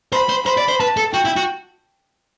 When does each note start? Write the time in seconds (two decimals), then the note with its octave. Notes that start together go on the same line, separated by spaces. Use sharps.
0.12 C5 B5
0.29 C5
0.46 C5 B5
0.57 D5
0.68 C5
0.79 B4 A5
0.97 A4
1.13 F#4 G5
1.25 E4
1.36 F#4